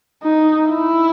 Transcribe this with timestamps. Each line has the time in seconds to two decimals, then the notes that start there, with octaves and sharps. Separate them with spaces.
0.23 D#4
0.70 E4